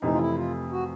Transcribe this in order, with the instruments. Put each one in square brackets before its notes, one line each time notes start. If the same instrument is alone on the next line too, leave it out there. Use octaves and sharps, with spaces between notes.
[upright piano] F2 C3 E3 A3 [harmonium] D#4
[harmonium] F4
E4
F4
F#4